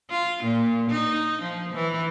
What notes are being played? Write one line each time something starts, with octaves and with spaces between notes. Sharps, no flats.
F4
A#2
D#4
F3
E3